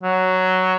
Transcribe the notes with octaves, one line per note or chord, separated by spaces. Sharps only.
F#3